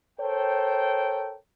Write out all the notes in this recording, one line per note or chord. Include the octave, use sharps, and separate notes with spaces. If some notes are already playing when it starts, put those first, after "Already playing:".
A4 A#4 C5 C#5 G5